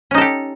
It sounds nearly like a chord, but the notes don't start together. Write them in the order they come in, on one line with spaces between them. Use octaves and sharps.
C#4 D#4 A4 G4